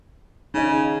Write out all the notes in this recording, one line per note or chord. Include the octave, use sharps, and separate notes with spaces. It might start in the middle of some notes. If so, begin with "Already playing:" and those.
C#3 D#4 D#5